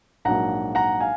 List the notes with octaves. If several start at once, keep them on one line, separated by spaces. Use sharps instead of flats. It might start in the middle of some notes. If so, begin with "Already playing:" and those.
A#1 G#2 F#3 A#3 F#5 A#5
F#5 A#5
F5 G#5